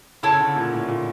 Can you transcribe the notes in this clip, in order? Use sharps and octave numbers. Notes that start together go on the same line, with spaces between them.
C#3 E4 A4 C#5
D3
A#2
A2
A#2